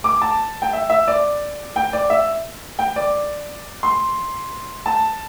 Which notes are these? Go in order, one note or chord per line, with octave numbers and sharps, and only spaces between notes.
D6
A5
G5
E5
E5
D5
G5
D5
E5
G5
D5
C6
A5